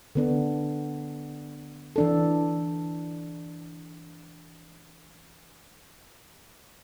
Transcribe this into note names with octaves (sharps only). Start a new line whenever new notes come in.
D3 B3 D4
E3 D4 A4